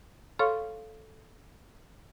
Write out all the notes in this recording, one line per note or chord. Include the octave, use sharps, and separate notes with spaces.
A4 C#5 F5 C6 C#6 F6